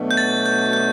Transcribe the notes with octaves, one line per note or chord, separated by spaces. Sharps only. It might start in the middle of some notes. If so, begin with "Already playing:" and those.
Already playing: B2 F#3 A3 D4 F#4
G6
A6
G6
G6